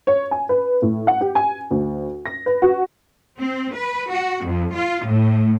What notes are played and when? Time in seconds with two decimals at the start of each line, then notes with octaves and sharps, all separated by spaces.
0.07 C#5
0.31 G#5
0.49 B4
0.82 A2
1.07 F#5
1.21 G4
1.35 G#5
1.71 D2
2.26 A#6
2.46 B4
2.62 F#4
3.39 C4
3.75 B4
4.11 F#4
4.44 F2
4.74 F4
5.06 A2